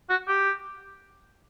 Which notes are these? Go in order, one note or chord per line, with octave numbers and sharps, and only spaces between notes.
F#4
G4